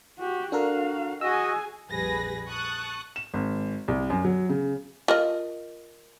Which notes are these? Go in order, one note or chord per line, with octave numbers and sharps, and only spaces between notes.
F#4 G4
D4 F#4 A4 A#4 F5
F#4 G#4 D#5 G#5 E6
A#1 F2 G3 G#4 B4 A#6
A5 C#6 D#6 F#6
E7
G#1
C2
F#2
F#3
C#3
F4 A#4 D#5